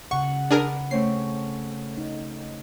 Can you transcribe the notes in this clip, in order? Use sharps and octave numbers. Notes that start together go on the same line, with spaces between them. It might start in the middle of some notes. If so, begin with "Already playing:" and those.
C#3 F#5 C#6
D4 G#4 A#4 B4
A3 C4 C#4 C7
D#4